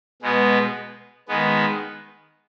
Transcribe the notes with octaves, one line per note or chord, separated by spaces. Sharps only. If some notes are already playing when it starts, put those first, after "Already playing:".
B2 G#3 B3
D#3 G#3 B3